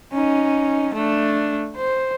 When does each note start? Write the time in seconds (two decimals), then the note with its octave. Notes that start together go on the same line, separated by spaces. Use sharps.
0.13 C#4 D#4
0.94 A3 D4
1.77 C5